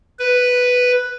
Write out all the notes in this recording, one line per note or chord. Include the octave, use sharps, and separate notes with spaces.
B4